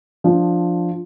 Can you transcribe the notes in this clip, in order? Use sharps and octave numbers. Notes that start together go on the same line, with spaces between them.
F3 D4